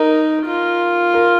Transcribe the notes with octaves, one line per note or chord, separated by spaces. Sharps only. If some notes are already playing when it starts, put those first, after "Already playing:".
Already playing: D#4 A#4
F4
A#4